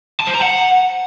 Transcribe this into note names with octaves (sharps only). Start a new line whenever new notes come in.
A5
C5
A#5
F#5